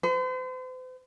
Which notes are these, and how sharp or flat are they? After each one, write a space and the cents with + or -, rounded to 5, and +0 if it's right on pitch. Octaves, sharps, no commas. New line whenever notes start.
C5 -45